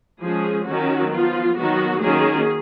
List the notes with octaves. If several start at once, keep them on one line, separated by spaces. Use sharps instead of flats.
F3 G#3 C#4 G#4
D#3 F#3 C#4 F#4
F3 B3 F4
D#3 F#3 B3 F#4
D#3 F#3 A#3 C#4 G#4